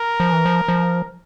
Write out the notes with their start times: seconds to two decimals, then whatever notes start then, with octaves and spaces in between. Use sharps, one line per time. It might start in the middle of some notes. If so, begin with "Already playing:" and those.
Already playing: A#4
0.20 F3
0.33 E3
0.46 F3
0.68 F3